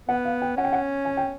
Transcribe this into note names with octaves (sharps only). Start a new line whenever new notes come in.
B3 F#5
F5
G5
C#4 F#5
G5
F#5
G#5
G5